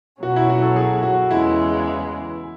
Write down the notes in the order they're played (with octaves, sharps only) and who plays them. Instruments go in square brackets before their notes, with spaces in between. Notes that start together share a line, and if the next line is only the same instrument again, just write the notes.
[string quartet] B2 F#3 C#4 [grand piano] F#4
[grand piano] E4
F#4
A4
G#4
F#4
[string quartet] E2 C#3 E3 G#3 [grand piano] E4